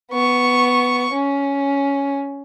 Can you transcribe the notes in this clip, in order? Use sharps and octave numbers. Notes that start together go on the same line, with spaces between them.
B3 C#6
C#4